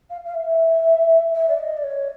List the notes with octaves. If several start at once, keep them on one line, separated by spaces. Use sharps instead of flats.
F5
F5
E5
E5
D5
D#5
D5
C#5